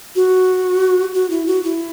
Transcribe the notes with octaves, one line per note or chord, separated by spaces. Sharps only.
F#4
F#4
E4
F#4
E4